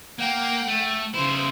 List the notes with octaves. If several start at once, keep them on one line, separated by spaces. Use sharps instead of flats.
A#3 F#5 G5
A3
C#3 E4 C5